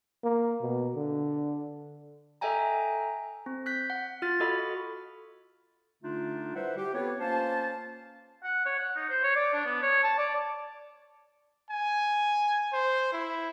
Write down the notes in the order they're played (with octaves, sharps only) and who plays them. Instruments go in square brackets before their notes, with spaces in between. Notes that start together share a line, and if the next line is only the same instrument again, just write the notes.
[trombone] A#3
B2
D3
[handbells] A4 D#5 E5 G5 G#5 A#5
C4
F#6 G6 B6
F#5
F4 F6 A6
F#4 A4 D#5 F#5 B5
[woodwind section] D3 A3 D4 D#4 F4
G3 E4 B4 C5 E5 F#5
G4
B3 C4 F4 A4 B4 C#5
A#3 C#4 F4 C5 F5 A5
[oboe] F#5
C#5
F#5
D#4
C5
C#5
D5
D4
B3
C#5
A5
D5
[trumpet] G#5
C5
E4